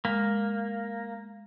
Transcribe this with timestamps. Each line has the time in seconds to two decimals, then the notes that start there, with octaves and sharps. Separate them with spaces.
0.05 G#3 A#3